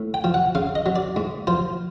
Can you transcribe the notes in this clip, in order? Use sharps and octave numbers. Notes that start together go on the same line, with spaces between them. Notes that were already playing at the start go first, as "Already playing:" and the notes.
Already playing: A2
G5
F3
F#5
C#3 F5
D#5
F#3
D5
G#2
F3 C5